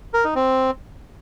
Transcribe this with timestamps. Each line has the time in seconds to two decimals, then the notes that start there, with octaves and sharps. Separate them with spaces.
0.14 A#4
0.24 D#4
0.35 C4